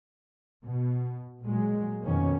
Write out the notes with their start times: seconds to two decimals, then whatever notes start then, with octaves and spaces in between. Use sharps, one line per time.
0.65 B2
1.43 A#2 F#3 G#3
2.04 F2 B2 D#3 A#3 C#4